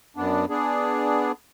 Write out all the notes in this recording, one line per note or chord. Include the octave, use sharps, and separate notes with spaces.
F#2 B3 D4
B3 D4 G#4